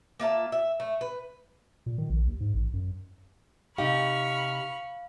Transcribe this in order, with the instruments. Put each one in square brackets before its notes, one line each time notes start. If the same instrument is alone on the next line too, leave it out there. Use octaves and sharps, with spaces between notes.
[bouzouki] A#3 F4 E5 A5
E5
A3
B4
[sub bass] A#2
D#3
A#1
D#2
G#2
A1
F#2
[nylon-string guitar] C3 D#4 G4 [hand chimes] F5 [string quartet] B5 C#6 F6